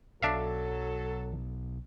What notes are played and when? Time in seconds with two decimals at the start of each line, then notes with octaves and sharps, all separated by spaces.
0.22 B1 F#3 D4 A4 E5 F5